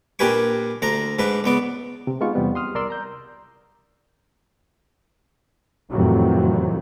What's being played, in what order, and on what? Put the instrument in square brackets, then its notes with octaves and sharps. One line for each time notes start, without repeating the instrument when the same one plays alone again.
[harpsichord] A#2 D4 G4 B4 G#5 C#6
D2 D4 A#5
G#2 D4 B4
C#2 B3 D5
[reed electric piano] C3
G#3 B3 D#4 F4 C#6
E2 C3 G3 B3
C6 D#6 F6
C2 A#4 D5 C6 E6
A#5 G6
[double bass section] F2 A2 C3 D#3 E3 F#3